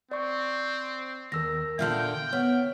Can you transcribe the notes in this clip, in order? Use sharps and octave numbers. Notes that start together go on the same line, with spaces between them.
C4 D5 C#6
D#2 A#4 E6 A#6
A#2 D3 D4 E5 G5 F6 G6
B3 C#5 F6